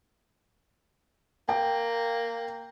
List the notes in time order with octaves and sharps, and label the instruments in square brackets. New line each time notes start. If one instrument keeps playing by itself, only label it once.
[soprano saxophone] A#3 [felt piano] G5